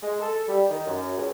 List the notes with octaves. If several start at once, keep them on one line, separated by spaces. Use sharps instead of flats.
G#3
A4
G3
D#3
F#2
C#2